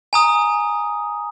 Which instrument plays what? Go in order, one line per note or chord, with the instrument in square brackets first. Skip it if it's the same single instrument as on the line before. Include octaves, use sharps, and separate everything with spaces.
[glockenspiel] G#5 A#5 D#6